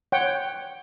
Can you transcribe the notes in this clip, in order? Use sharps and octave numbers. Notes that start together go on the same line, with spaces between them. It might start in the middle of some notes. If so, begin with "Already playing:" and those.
C#5 F#5 G5